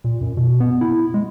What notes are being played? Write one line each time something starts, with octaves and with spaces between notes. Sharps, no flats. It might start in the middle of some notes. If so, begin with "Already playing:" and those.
A#2
F#2
B2
B3
E4
G#3